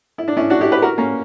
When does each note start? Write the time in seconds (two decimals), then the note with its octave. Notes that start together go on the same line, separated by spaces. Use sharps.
0.18 E4
0.28 D4
0.37 C#4 E4
0.50 D4 F#4
0.61 E4 G4
0.72 G4 B4
0.82 F#4 A#4
0.98 A#3 C#4